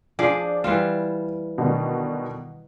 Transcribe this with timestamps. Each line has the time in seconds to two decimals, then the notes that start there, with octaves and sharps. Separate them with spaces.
0.19 F3 D4 G#4 D5
0.64 E3 G3 F4 E7
1.58 B2 D3 D#3